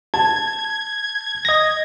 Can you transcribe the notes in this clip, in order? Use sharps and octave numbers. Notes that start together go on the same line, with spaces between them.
A5 G#6
D#5 A#6